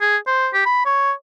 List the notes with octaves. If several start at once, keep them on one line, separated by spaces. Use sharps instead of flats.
G#4
C5
G4
B5
C#5